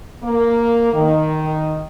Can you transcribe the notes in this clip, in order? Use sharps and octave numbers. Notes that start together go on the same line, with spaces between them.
A#3
D#3